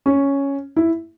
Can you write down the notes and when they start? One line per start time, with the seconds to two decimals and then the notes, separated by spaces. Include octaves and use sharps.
0.06 C#4
0.76 E4